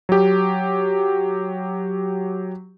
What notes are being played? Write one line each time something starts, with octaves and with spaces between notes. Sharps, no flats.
F#3 G4